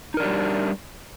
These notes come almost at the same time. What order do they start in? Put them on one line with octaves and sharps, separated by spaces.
D#4 A#4 D4 G4 G3